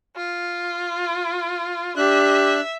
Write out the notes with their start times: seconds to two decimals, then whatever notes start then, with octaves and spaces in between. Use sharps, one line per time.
0.16 F4
1.97 D4 G4 E5 F#6